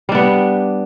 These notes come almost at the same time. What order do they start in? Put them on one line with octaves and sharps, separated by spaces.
G3 D4 B3